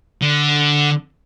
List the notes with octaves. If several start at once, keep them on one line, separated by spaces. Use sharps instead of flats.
D3